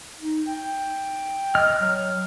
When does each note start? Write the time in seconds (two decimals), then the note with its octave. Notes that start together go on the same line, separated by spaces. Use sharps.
0.21 D#4
0.48 G5
1.55 D#5 F6
1.80 F#3